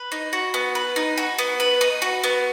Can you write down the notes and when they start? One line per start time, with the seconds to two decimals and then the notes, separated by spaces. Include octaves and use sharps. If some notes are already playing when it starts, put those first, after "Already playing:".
Already playing: B4
0.12 D#4
0.33 F#4
0.54 B3
0.75 B4
0.96 D#4
1.18 F#4
1.38 B3
1.60 B4
1.81 D#4
2.02 F#4
2.24 B3